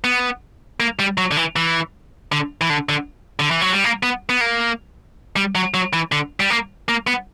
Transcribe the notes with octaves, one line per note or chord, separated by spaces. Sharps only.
B3
A#3
G3
F#3
D3
E3
E3
D3
E3
D3
D3
D3
E3
F#3
G3
A#3
B3
B3
A#3
G3
F#3
F#3
E3
D3
G3
A#3
A#3
B3